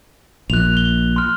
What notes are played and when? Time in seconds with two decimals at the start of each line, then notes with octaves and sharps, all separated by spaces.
0.50 A#1 A#2 F#6 F7
0.77 G7
1.16 C6 F6